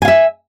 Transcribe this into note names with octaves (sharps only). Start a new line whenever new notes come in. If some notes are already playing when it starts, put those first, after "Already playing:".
E5 F5 G#5